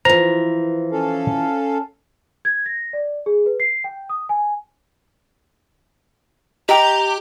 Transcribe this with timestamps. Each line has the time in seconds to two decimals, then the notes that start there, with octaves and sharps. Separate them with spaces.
0.05 E3 F3 C5 A#5
0.92 C#4 A4 F5
2.45 G#6
2.66 A#6
2.93 D5
3.26 G#4
3.46 B4
3.60 C7
3.84 G5
4.09 D#6
4.29 G#5
6.69 G4 D#5 G5 A#5